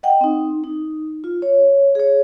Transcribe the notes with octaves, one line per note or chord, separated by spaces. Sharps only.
D#5 F#5 G5
C4 D#4
D#4
F4
C#5
G#4 C#5